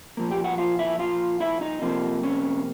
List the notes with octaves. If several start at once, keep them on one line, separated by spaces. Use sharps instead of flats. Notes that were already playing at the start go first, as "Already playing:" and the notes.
A#2 F3 A#3
G4 G5
F#4 F#5
F4 F5
E4 E5
F4 F5
E4 E5
D#4 D#5
F2 C3 F3 A#3
C#4 C#5